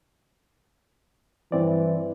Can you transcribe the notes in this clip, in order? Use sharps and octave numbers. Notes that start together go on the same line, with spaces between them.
G2 E3 C4 D5